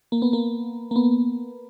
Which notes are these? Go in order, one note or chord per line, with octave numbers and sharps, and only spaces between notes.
A#3
B3
A#3
A#3
B3